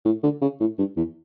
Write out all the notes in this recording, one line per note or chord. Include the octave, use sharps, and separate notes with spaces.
A2
D3
C#3
A2
G2
E2